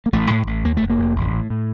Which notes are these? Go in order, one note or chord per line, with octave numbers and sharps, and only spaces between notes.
A#3
A1 A3
A2
A1
D#2 A#3
F1 A3
A#3
F1
A1
A2
A2